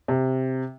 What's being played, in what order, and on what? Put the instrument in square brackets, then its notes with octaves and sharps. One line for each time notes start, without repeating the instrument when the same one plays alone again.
[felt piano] C3